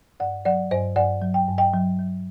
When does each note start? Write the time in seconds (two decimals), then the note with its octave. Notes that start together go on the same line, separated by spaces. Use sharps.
0.20 G2 D5 F#5
0.45 F#3 D5 F#5
0.71 G2 C5 D#5
0.96 G2 D5 F#5
1.22 F#3
1.34 G5
1.48 G2
1.58 D#5 G5
1.74 F#3
1.99 F#3